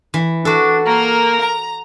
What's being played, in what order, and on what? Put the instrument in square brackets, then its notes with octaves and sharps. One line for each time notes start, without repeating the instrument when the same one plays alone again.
[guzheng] E3
[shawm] D4 [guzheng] F#4 A4
[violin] A#3 [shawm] A#4
[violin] A#5